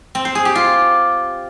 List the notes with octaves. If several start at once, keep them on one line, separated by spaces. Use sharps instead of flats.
C4
C5
G#4
G4
F4